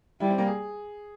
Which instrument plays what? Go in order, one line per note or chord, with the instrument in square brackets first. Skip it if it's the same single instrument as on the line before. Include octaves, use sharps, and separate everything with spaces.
[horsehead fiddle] G3 [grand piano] E4
[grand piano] C4
A#3
G#4